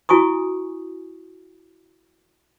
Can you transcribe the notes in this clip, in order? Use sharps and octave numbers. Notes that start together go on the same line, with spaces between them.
E4 F#4 G#5 C#6 D#6